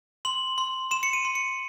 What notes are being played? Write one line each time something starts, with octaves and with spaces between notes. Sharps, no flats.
C6 F#7
C6
C6 E7
C#7
D#7
C6
C#7